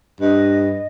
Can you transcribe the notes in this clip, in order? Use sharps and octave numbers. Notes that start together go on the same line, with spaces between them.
G2 D#5